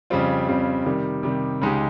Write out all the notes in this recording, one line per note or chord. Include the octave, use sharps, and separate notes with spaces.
F2 C#3 G3 C4 F4
F2 C#3 G3 C4 F4
C3 D#3 G3
C3 D#3 G3
C#2 C#3 G#3 D#4 G4